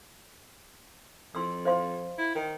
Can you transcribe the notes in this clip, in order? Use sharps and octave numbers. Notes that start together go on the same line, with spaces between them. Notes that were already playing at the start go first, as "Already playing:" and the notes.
F2 C6 E6
C5 F5 C6
E4
D#3